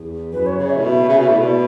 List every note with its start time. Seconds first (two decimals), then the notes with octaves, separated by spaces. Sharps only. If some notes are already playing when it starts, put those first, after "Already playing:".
Already playing: E2
0.33 F#2 B4
0.46 C#5
0.59 C#3 C#5
0.71 E5
0.77 A2
0.83 B2
1.09 C#3
1.19 B2
1.29 A2
1.34 D5
1.40 B2